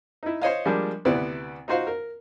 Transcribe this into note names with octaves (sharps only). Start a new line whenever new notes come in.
D#4 E4
C5 C#5 D#5 F5
F3 G3 G#3 A#3 D4
D2 C3 B3 E4 D5
D#4 F4 F#4 C5 F5
A#4